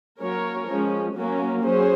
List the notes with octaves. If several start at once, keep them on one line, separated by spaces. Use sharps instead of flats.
F#3 A#3 C#4 A#4 C#5
F3 G#3 C#4
F#3 A#3 C#4
F#3 C#4 G#4 C5